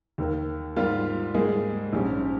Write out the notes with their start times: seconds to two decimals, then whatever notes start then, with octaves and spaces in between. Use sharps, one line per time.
0.18 D#2 D#3 A#3
0.76 G#2 G3 A#3 F4
1.34 G#2 G3 A#3 D#4 G#4
1.93 A#1 G#2 G3 C#4 G4